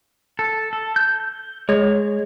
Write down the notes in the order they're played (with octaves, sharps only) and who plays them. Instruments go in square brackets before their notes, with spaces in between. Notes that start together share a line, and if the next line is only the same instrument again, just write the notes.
[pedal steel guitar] A4
A4
G6
[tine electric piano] G#3 [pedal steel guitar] C#5